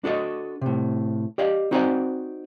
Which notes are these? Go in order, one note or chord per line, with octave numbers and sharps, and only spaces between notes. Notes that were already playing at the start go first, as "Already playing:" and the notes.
D4 F#4 A4 D#5
A2 C3
G4 D5 D#5 F5
C4 D#4 F#4 C5 D5 G#5